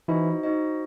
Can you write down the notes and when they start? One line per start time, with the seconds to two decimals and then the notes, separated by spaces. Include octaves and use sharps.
0.08 E3 D#4 E4 F#4 C5 D#5
0.43 D#4 F#4 C5 D#5